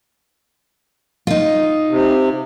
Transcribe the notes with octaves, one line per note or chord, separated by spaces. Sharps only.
D#4 F4
C3